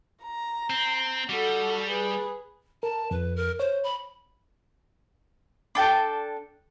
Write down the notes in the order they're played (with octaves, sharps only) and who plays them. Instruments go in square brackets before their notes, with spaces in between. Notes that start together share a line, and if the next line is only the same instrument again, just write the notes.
[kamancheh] A#5
[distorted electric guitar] C4
[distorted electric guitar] G3 [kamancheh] F#4 A4
[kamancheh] G#4 B4
[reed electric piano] A#4 [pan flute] A5
[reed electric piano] F2 [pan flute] B4
[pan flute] A#4
[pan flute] C5 [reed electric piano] C#5
[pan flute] B5
[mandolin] D4 A4 G5 A5